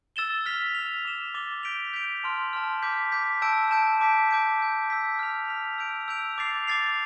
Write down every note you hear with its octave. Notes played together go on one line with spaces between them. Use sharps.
E6 A6 E7 G7
F6 B6 F7
F6 B6 F7
D6 A6 E7 G7
D6 A6 E7 G7
G6 B6 D7 F7
G6 B6 D7 F7
A5 C6 F6
A5 C6 F6
D6 G6 B6
D6 G6 B6
A5 E6 G6 D7
A5 E6 G6 D7
A5 D6 G6 B6 D7
A5 D6 G6 B6 D7
E6 G6 B6
E6 G6 B6
F6 B6 F7
F6 B6 F7
E6 G6 D7 F7
E6 G6 D7 F7
D6 A6 C7 F7
D6 A6 C7 F7